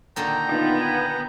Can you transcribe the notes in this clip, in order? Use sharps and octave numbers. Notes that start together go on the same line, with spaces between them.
A#2 D3 D#3 G5 A#5
B3 D#4 F4
G#5